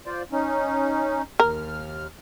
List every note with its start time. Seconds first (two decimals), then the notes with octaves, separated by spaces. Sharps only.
0.06 F4 C5 D5
0.32 C#4 D#4
1.40 D#2 A#4 F6